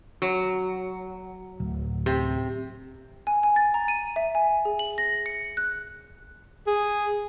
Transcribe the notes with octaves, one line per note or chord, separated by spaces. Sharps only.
F#3
D1
C3
G#5
G#5
A6
A#5
D#7
E5
G#5
G#4
F#7
A#6
C#7
F#6
G#4